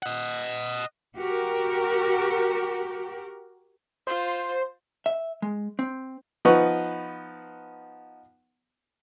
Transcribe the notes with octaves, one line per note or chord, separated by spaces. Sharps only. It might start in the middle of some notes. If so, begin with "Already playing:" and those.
D#5 F#5
F#4 G4 A#4
F4 C5
E5
G#3
C4
F3 B3 D#4 B4 F#5 C#6